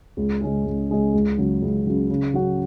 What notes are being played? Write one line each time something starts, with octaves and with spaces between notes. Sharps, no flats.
C#2
C#3 G#3 C#4 G#4
C#2
C#3 G#3 C#4 G#4
C#2
C#3 F#3
C#2
C#3 F#3
C#3
F#3 C#4 F#4